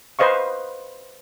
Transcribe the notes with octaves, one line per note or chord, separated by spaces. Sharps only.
B4 C5 D#5 F5 C#6